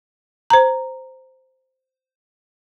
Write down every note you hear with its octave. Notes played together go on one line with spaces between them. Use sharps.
C5 A#5